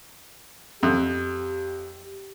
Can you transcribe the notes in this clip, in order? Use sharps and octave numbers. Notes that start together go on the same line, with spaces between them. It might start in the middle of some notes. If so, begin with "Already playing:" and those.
F2 G4